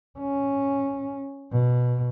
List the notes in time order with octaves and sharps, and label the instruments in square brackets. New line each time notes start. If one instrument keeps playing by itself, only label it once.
[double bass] C#4
B2